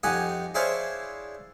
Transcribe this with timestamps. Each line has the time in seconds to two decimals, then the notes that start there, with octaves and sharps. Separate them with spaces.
0.03 F2 D#4 G4 F#5 G#5 D#6
0.54 D4 E4 G#4 C5 C#5 F5